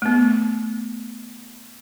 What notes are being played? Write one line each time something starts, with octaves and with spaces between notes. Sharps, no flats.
A3 B3